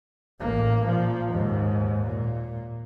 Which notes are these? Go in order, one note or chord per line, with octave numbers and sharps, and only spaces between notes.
A1 A#3
A#2 F3
D#2 G#2
A#2